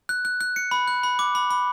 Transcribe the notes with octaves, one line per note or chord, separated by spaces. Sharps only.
F#6
F#6
F#6
C#7
B5
F#6
B5
D6
B5
B5